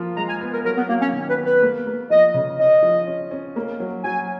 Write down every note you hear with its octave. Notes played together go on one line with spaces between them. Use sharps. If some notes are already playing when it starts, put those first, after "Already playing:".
Already playing: F3 A#3 F4
G#3 A#5
G#5
B3
A#4
F#3 A#4
B3
F#3 A#3
C#4
D#3
B4
B3
B4
A#3
A#3
F3 D#5
C#3
C#4 D#5
F3
C#4
C#4
A#3
F#3
F#3 G#5